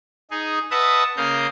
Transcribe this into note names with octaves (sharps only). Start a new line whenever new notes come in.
D#4 G#4
B4 D#5 E5 F#5 A5 D#6
C#3 A#3 D#5 F5 G6